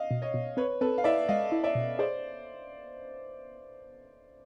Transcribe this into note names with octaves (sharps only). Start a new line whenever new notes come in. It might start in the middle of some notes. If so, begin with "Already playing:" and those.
Already playing: D#5 F5
B2
C#5 D#5
B2
C4 B4 C#5
C4 A4 B4
F5
E4 D5 E5
G#3 D#5 F5
E4
D5 E5
B2
G#4 C5 D5